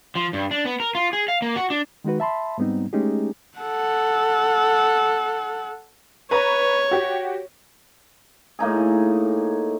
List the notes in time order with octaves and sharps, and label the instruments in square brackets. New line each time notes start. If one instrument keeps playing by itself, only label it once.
[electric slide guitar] F3
G2
D4
B3
A#4
F4
G#4
F5
A#3
F#4
D4
[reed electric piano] D#3 G#3 D#4 F#4 B4
E5 A5 B5 C6
G#2 G3 B3 C4 D#4
G#3 A3 C#4 D#4 G4 G#4
[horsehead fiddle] A4 F#5
[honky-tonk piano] B4 A#5 C#6 [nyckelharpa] C#5
[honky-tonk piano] F#4 G4
[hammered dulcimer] A2 A#3 D#4 G#4